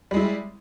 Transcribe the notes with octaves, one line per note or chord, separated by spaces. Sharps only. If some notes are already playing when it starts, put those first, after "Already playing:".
G3 G#3 E4